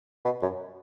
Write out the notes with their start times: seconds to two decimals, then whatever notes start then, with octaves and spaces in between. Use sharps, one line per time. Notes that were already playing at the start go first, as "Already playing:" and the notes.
0.25 B2
0.42 F#2